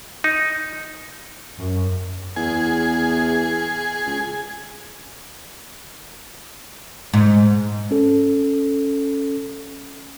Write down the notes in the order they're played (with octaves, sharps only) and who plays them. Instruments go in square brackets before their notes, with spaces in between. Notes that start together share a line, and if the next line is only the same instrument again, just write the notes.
[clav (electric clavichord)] D#4
[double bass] F#2
[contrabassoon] E2 [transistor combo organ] G#4
[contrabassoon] C#2
[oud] G#2
[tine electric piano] C#4 A4